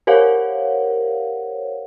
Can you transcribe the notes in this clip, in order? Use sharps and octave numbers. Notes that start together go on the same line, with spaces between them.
G4 A#4 C5 C#5 F5 F#5